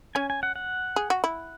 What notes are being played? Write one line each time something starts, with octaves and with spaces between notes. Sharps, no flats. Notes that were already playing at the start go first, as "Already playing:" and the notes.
C#4 G#5
G#5
F#5
F#5
G#4
F#4
E4